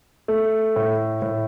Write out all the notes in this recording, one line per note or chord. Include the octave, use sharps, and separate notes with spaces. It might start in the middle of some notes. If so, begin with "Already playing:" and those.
A3
A2
A2